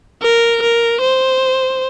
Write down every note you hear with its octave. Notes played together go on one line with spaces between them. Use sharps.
A#4
A#4
C5